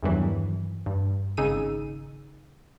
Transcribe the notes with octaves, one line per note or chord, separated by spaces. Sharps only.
E2 G2 D#3 E3 F#3
G2
G#1 C#3 D#4 G#4 E6 D#7